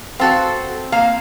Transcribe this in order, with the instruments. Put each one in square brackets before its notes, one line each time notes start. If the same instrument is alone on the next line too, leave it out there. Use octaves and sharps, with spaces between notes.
[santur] C4 [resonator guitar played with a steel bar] F#4 A4 F5
[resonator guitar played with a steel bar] A#3 F5